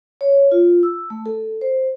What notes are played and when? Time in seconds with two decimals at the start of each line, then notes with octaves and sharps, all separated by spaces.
0.21 C#5
0.52 F4
0.83 E6
1.10 A3
1.26 A4
1.61 C5